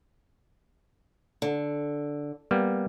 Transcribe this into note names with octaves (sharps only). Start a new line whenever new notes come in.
D3
G3 A#3 B3